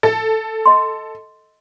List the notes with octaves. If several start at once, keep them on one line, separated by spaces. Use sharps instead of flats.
A4
D#5 C6